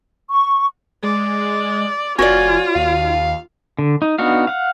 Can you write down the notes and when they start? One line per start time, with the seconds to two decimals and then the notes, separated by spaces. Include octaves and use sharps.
0.30 C#6
1.03 G#3 D5
2.19 F1 F4 F#4 C#5 D5 G#5
2.75 D#2 F5
3.79 D3
4.02 D#4
4.18 B3 D4 D#4 F#4 F5
4.47 F5 F#5